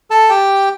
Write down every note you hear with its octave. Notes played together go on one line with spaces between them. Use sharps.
A4 A5
G4 G5